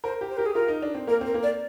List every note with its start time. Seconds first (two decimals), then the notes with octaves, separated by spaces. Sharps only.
0.04 A#4 C5
0.21 G4
0.30 C5
0.37 G4 A#4
0.45 G#4
0.54 F4 A#4
0.68 D#4
0.82 D4
0.95 C4
1.07 A#3 A#4
1.21 C4 A#4
1.34 A#3
1.43 D5